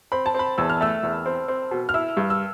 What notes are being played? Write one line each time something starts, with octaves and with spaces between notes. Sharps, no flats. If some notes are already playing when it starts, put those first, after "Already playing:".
C4 B5
A5
C4 B5
E2 E6
F6
A3 E6
E2
C4
C4
B2
F6
E4 E6
G2
E6